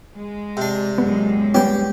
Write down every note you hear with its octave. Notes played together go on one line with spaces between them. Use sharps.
G#3
C3 D4
F#2 A#2 G#3 B3
G3 B3 C#4 G4 G5